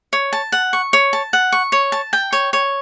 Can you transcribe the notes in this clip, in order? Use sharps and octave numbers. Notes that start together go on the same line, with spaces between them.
C#5
A5
F#5
C#6
C#5
A5
F#5
C#6
C#5
A5
G5
C#5
C#5